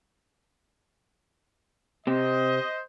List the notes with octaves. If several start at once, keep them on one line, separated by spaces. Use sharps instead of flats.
C3 C4 C5 D#5